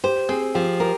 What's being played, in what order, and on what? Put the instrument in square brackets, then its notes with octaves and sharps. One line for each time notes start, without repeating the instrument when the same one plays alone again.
[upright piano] G4 [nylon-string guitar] C5
[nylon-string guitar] C4 [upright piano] G#4
[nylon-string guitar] F3 [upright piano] G4
[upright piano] G4 [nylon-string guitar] A#4